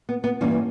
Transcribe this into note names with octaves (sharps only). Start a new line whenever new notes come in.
B3
B3
G2 E3 A#3 C#4